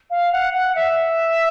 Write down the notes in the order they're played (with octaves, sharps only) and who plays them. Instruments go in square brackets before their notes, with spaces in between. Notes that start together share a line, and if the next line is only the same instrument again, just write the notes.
[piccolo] F5
F#5
F#5
E5